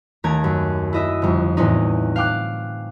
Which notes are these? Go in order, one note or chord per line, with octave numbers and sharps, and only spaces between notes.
D#2 A3 C#4 A#5 G#6 D7
F#2
E4 D#5 E5
G1 F2
E2 A2 C4 C#4 D#4
F5 G5 D6 F#6